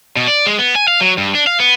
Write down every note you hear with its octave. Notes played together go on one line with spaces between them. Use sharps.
B2
D5
G#3
B3
G#5
F5
F#3
G2
D4
F5
B3